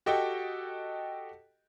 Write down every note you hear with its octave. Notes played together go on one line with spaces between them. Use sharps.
F#4 G4 A4 D#5 G5